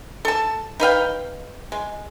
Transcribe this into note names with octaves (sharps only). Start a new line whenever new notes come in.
A4 A5
D#4 B4 F5 G5
G#3